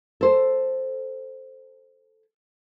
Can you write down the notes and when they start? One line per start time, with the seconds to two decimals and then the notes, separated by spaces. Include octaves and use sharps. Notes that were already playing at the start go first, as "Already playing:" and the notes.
0.21 A4 C5